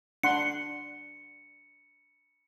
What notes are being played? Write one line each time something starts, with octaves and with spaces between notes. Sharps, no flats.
D4 F#5 C6 C#7